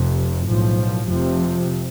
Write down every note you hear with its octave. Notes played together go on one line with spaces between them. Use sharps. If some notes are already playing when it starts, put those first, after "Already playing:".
Already playing: F1 F2 C3
B1 A2 F3
F1 F2 C3 F3